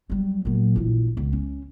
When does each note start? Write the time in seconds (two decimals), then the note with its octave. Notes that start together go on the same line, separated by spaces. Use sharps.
0.10 F#3 G3
0.45 A#2 F#3
0.76 A#1 E3
1.17 C#2
1.33 C#4